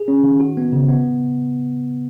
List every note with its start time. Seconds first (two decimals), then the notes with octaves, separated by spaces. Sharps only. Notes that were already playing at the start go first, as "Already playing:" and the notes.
Already playing: G#4
0.08 C#4
0.24 D#3
0.40 F#4
0.57 B3
0.73 C#3
0.89 B3